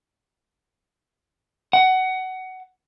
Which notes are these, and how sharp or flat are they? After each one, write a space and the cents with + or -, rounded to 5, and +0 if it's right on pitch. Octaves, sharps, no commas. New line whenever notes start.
F#5 +20